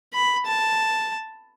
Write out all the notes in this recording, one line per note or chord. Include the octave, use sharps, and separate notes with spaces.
B5
A5